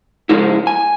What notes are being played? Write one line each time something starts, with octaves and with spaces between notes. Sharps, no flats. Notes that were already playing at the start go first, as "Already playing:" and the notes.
C#3 F3 G#3 E4
G#5